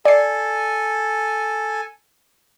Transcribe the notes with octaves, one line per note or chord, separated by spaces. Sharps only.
A4 D5 G#5 C7